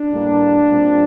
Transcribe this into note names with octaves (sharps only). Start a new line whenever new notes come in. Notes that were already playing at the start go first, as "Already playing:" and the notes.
Already playing: D4
A2 G3 A#3
A#2 G3 C4